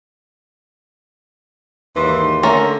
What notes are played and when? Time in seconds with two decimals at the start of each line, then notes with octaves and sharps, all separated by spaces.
1.96 D#2 G#2 E3 C6
2.43 D3 A3 C#4 A#4